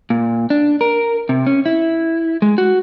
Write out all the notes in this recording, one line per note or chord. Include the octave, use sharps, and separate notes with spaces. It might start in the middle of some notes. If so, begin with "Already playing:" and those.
A#2
D4
A#4
C3
C#4
E4
G#3
F#4